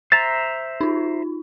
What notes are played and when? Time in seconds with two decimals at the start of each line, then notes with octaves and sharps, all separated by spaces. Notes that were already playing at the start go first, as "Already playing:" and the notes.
0.12 C5 E5 A#5 A6
0.81 D#4 F4